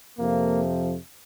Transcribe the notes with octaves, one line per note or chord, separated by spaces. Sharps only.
F2 C3 F3 A#3